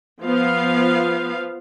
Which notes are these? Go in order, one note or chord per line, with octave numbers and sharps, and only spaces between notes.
F3 B3 F5